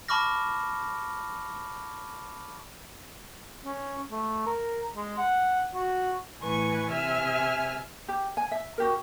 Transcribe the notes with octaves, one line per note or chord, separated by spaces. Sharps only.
A5 B5 C#6 D6 F6 A#6
C#4
A3
A#4
G#3
F#5
F#4
A2 E3 B4 G#5 C#6
C3 E5 G#5 F6
G4
G#5
E5
F#4 G4 A#4